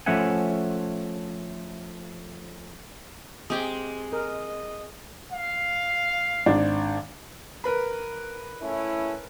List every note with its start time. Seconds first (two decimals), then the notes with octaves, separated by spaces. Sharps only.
0.06 F3 A3 C#4 E5 F#5 G#5
3.50 G#3 C4 G4 G5 D#6
4.13 A#4 D#5
5.32 F5
6.46 G#1 D4
7.64 A#4 B4 B5
8.62 A3 C#4 E4